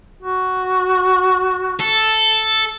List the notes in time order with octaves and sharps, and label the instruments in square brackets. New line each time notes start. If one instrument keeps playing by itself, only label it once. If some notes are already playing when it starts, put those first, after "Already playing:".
[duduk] F#4
[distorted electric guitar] A4